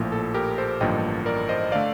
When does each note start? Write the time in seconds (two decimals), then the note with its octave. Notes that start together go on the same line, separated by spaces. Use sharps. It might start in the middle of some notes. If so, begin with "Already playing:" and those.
Already playing: A#1 A2 F3 A#3
0.12 A4
0.34 G4 A#4
0.58 A4 C5
0.81 A1 G2 D3 F3 A#3 D#5 G5
1.26 A#4 D5
1.49 C5 D#5
1.72 D3 A3 D5 F5